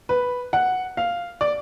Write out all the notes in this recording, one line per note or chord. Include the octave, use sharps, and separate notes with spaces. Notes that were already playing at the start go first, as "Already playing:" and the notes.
B4
F#5
F5
D5